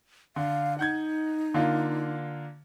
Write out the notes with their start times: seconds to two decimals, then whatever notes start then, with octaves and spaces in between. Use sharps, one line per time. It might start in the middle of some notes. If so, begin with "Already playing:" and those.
0.36 D3 F5
0.79 D#4 F#5 G6 G#6
1.54 D3 A#3 F4